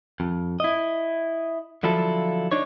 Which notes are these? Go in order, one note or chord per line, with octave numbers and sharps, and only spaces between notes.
F2
E4 D#5
D3 F3 F#3 E4 F4 A4
D4 D#4 C#5